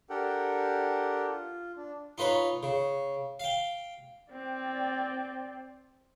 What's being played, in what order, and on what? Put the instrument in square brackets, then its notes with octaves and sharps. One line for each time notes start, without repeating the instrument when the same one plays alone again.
[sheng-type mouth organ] D4 G4 A4 A#4 F#5 G5
F4
D4
[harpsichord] D#4 F4 B4 C#5
C#3
F5 G5
[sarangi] C4 [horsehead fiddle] D5 G5